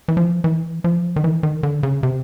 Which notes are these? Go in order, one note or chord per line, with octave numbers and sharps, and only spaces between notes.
E3
F3
E3
F3
D#3
E3
D#3
D3
C#3
C3